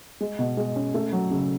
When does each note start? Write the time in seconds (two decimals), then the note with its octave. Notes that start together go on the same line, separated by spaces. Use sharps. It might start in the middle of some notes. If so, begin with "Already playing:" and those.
0.21 G#3
0.39 B2
0.57 G#3
0.76 C#4
0.94 A3
1.13 F#3
1.31 C#3